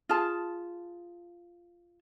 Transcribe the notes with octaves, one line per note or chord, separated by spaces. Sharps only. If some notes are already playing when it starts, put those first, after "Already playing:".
F4 G#4 A5